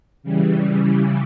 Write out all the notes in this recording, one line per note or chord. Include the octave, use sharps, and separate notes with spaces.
C#3 E3 G3